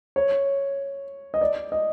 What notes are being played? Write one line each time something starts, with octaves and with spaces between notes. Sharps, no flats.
C#5
D#5
D5
D#5